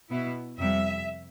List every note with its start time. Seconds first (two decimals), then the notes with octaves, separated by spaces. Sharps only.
0.11 B2 B3 E4
0.58 F2 C3 G3 E5